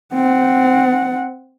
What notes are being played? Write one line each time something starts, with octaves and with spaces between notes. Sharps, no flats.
C4 F#5